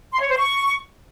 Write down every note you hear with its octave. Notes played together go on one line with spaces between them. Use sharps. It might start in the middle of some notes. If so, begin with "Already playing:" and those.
C6
C#5
C5
C#6